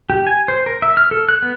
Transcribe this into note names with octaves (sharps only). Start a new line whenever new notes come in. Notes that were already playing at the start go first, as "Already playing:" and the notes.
G4
G#5
C5
A#4
E5
F6
A4
F#6
B3